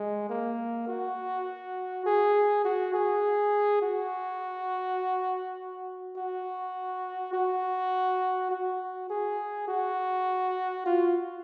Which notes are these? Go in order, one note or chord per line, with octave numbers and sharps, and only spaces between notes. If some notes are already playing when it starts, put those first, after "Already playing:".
Already playing: G#3
A#3
F#4
G#4
F#4
G#4
F#4
F#4
F#4
F#4
G#4
F#4
F4